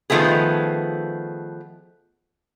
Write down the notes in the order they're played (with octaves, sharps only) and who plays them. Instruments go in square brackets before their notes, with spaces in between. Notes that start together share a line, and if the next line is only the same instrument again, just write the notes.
[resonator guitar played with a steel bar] D#3 F3 A3 B3 G#4